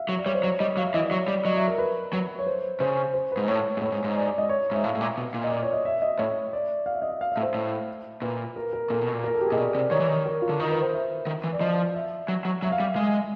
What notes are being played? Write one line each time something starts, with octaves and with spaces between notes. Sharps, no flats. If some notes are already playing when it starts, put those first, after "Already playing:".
Already playing: E5 F5
F#3
D5
G3 C#5
C5
F#3 C#5
G3 D#5
F#3 F5
E5
E3 D#5
D5
F#3 C#5
G3 D5
F#3 D#5
E5
A#4
B4
F#3 B4
C#5
C5
C#3 C5
C5
B4
G#2
A2 C#5
G#2
A2 C#5
G#2
G#2
D5
D5
D#5
C#5
G#2 E5
A2 F5
A2
A#2
B2
A#2
D#5
D5
C#5
D#5
E5
D#5
A2 C#5
D5
F5
E5
D#5
E5
F5
E5
A2
C5
A2
A#2 B4
A#4
A#4
A#2 A4
B2
A#2
A#4
A4
G4
G#4
A#2 D#5
B2 D5
C3 D5
D#3 C#5
E3
D#3
A#4
F4
D3
D#3 A#4
B4
C5
E5
D#3
E3
D5
F3 D#5
E5
F#3
F#3
F#3 E5
F5
G3 E5
G#3 F5